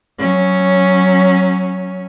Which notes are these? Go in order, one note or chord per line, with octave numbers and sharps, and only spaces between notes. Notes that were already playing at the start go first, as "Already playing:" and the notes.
F#3 C#4